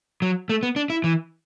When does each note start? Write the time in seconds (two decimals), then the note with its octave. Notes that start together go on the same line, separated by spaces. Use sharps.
0.22 F#3
0.49 A3
0.63 B3
0.76 D4
0.90 E4
1.04 E3